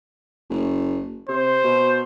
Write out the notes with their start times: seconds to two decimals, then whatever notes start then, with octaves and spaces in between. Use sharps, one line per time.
0.50 F#1
1.29 C3 C5
1.64 B2